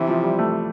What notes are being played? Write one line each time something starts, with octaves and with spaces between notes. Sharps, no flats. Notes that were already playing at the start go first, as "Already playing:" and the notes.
Already playing: C3 E3
F3
G3
A3